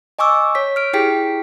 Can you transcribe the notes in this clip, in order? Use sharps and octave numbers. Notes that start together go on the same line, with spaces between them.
D#5 G#5 C#6 D6 E6
C#5 B6
F6 D7
E4 G4 G#4 G5 B6 D7